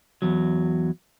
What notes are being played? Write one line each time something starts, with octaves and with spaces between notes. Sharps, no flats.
E2 F#3